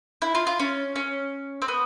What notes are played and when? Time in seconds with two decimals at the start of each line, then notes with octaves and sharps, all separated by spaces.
0.22 E4
0.35 F4
0.47 F4
0.59 C#4
0.96 C#4
1.62 C4
1.68 B3